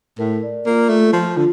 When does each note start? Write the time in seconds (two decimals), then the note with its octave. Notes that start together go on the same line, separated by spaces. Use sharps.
0.19 A2 A#4
0.43 D5
0.66 A#3 F4
0.89 A3 F4
1.13 F3 F4
1.37 D3 F4